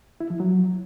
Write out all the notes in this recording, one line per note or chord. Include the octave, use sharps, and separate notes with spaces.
E4
F3
F#3